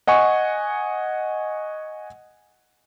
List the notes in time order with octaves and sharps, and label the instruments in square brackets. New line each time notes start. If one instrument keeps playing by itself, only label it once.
[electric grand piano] D#5 F#5 G#5 C#6